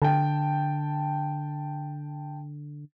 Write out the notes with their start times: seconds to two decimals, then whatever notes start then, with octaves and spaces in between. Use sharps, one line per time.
0.02 D3 G5 A5